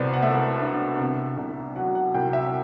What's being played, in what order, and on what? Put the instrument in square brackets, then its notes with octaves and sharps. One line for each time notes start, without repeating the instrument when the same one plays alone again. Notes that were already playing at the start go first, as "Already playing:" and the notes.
Already playing: [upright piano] C2 B2 B4 C5 D5
F#5
A3 E5
D4
C3
C2
F#3 F#5
F#5
C2 G5
E5